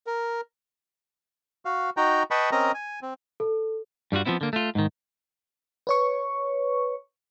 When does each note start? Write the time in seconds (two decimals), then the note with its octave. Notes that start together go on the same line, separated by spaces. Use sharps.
0.07 A#4
1.65 F#4 F5
1.97 D#4 F#4 G5 A#5
2.31 B4 D#5 G5 A5 B5 C#6
2.52 C4 C#4 A#4 D#5 A#5
2.74 G#5
3.02 C4
3.40 A4
4.12 G2 G3 F4 F#4
4.25 F3 G3 B3 C4 E4
4.41 D3 A#3
4.53 A3 F4
4.75 G#2 D#3
5.87 B4 C#5 C#6